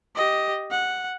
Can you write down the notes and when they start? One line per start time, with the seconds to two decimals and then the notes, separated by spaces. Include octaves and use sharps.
0.16 G4 D#5
0.71 F#5